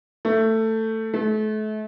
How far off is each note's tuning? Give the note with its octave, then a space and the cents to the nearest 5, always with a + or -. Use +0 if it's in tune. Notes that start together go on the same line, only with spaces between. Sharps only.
A3 +15
A3 -35